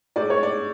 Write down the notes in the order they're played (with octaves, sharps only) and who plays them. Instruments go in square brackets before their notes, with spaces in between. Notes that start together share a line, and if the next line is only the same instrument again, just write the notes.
[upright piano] A2 G#3 D5
C#5
D5